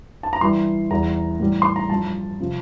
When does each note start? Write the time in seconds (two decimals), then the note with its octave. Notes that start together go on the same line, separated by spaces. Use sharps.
0.23 A5
0.33 A#5
0.41 G2 E3 G3 C6
0.91 E2 E3 G3 A#5
1.40 A2 E3 G3
1.62 C6
1.76 A#5
1.89 G2 F3 A5
2.40 C3 F3